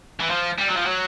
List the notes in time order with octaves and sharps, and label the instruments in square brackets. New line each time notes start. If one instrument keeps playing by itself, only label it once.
[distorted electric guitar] E3
F3
G3
F#3
F3
F#3